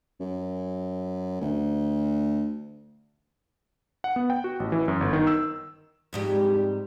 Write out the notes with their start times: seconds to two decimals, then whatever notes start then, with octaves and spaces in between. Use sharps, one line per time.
0.20 F#2
1.41 D2
4.04 F#5
4.16 B3
4.30 G5
4.44 F#4
4.60 A1
4.72 E3
4.88 F#2
5.01 G1
5.13 D#3
5.27 E6
6.13 F2 G#2 G3